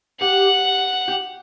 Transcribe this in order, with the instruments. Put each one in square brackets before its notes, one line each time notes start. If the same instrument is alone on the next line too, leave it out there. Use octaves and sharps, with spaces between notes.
[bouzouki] G4 [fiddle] F#5
[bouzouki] G4